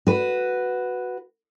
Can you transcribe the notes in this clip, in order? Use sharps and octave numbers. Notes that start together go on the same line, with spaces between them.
F#4 B4